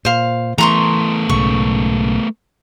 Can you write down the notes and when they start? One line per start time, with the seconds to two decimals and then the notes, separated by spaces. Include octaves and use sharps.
0.05 A#2 C5 F5
0.58 E3 A3 B3 A#5 C6 C#6
1.29 B1 G#2 C#3 C#6